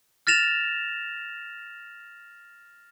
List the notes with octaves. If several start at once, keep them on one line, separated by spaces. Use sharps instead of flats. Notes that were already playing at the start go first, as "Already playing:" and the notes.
F6 A6 A#6 E7 F7